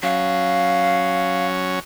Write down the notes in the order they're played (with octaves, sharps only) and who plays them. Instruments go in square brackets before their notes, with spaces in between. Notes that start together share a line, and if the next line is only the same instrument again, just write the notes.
[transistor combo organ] F#3 C#4 [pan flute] F5